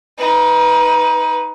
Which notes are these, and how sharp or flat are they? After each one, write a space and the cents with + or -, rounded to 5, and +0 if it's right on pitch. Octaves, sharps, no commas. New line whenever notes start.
D#4 +25 B4 +0